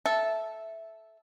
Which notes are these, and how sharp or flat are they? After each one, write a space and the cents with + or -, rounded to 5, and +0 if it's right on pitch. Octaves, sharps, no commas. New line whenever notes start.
A4 -10 E5 +0